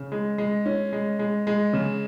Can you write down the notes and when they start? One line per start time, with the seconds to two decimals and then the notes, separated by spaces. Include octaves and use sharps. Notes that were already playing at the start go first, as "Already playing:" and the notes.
Already playing: C#3
0.12 G#3
0.38 G#3
0.66 C#4
0.93 G#3
1.19 G#3
1.47 G#3
1.73 C#3